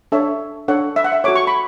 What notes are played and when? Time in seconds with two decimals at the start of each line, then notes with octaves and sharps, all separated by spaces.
0.12 D4 A4 C#5 E5
0.68 D4 A4 C#5 F#5
0.96 E5
1.04 F#5
1.12 E5
1.24 F#4 A4 C#5 D6
1.35 C#6
1.47 B5